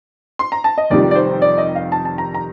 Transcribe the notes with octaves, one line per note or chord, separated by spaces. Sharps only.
C6
A#5
A5
D#5
F1 F2 D#3 G3 D5
D5
C5
D5
D#5
F5
A5
A5
A#5
A#5